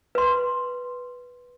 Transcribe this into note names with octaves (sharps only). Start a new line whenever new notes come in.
B4 C6